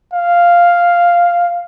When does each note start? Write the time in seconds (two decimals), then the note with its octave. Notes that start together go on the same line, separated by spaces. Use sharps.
0.13 F5